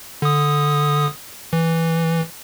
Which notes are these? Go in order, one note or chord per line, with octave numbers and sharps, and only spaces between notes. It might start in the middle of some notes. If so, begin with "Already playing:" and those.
D3 D#6
E3